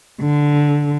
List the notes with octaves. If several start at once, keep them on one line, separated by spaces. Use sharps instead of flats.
D3